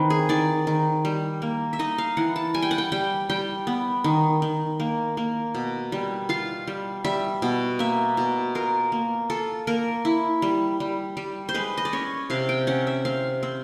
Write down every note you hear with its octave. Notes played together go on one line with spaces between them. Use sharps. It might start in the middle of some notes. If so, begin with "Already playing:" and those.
Already playing: D#3 C4 B4
G#4
D#3 D5
D#3
G3
A#3
E5
D#4 D#5
F5
E3 F#5
A5
G3 G#5
G5
F#5
G5
G3 G5
G3 G5
B3
D#3
D#3
A#3
A#3
B2
G3
F4 F5
G3
G3 E5
B2
A#3 E5
B2
F4 A#4
A#3
F4 A4
A#3 A#4
E4
G3
G3
G3
C5
G#3 B4
D#5
D5
C#4 C#5
C3 F5
G5
C#4 F#5
E5
C4 F5
C4